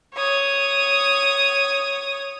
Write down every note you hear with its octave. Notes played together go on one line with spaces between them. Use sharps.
C#5 D#6